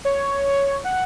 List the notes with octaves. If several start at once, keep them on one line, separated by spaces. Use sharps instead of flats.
C#5
F#5